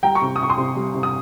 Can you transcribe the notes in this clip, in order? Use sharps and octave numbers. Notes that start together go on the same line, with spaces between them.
G3 G5 A#5
A#5 C#6
C3
D#6
C3 C#6
C6 D#6
C3
G3
C3
D#6